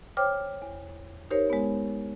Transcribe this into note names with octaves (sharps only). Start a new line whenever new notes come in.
C5 C#5 G5 D6 F6
E2
D#4 G4 A#4 C5 C#5
G#3 B3